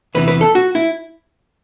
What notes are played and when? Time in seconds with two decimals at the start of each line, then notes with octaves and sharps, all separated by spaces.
0.15 E2 C3 E3 B4
0.28 B4
0.41 A4
0.55 F#4
0.75 E4